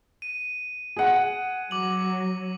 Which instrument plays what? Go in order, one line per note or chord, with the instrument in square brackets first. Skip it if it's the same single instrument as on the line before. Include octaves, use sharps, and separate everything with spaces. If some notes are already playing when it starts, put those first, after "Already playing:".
[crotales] D#7
[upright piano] G#4 F#5
[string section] F#3 [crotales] D6 F#7